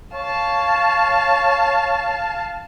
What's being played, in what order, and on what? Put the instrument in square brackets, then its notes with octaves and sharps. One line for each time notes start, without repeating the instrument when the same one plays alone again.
[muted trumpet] C#5 [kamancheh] F5 A5